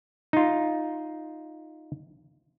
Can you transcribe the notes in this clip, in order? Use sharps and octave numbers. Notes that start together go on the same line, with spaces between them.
D#4 F4